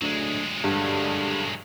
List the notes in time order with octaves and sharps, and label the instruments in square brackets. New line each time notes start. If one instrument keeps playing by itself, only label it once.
[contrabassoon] D2 [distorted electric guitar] F#3 G#3
[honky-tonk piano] G2 [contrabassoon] D3